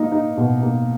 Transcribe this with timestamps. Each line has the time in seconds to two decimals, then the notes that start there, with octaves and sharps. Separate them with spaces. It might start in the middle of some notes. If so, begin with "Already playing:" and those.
Already playing: A#3 D#4
0.12 D#4
0.37 B2
0.62 A#3